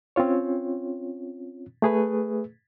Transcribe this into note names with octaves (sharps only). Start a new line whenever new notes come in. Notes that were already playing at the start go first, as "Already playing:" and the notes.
C4 C#4 F4 C#5
A3 G#4 B4